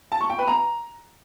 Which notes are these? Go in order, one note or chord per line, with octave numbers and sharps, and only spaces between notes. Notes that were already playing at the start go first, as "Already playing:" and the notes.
A5
C#6
G5
B4
A#5